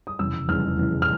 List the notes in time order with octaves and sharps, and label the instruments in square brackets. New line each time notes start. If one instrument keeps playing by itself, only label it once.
[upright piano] D#6
F1 E2 C#3 E6
F1 E2 C#3 F6
F1 E2 C#3
F6